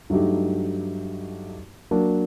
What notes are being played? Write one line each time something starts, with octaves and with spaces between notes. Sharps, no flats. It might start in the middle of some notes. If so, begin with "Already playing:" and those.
G2 F#3 A3 D#4 G4
F#3 A#3 D4